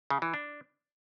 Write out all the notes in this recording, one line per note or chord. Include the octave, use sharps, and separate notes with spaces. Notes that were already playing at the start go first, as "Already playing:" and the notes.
C#3
E3
D4